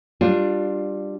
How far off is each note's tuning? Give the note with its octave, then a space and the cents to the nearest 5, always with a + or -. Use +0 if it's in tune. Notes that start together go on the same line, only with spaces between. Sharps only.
G3 +0 D4 +15 F4 +15